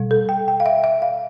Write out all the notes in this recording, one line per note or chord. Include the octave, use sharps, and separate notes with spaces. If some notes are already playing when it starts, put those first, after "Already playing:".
Already playing: B2 G3
A4
G5
G5
F5
E5
E5
F5